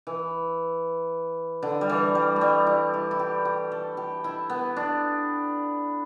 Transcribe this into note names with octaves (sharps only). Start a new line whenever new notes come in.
E3
D3
G3
E3
G3
A3
G3
E4
E4
E4
G4
G4
A4
G4
E4
B3
D4